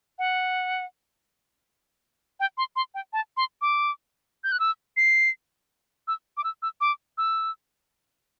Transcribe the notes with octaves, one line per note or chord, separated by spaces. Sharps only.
F#5
G5
C6
C6
G5
A5
C6
D6
G6
F#6
E6
C7
E6
D6
E6
E6
D6
E6